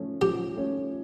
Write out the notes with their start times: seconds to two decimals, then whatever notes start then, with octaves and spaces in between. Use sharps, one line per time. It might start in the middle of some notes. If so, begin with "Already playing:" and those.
Already playing: F3 A3 C#4
0.22 F3 G4
0.55 A3 C#4